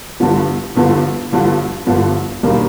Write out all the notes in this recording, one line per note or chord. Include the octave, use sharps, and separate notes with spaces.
G1 G2 D3 F3
G1 G2 D3 F3
G1 G2 D3 F3
G1 G2 D3 F3
E1 D#2 D#3 G3 A#3